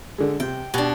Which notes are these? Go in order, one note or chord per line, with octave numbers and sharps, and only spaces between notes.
D3 G#3
C3 G5
B2 D4 G4